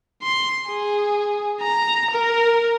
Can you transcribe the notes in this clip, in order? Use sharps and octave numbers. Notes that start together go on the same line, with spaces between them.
C6
G#4
A#5
A#4